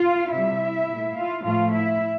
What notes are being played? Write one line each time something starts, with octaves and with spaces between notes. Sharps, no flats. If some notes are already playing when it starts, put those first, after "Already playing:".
Already playing: F4 F5
C3 G3 E4 E5
A#2 A3
F4 F5
A2 F3 A3 F4 F5
E4 E5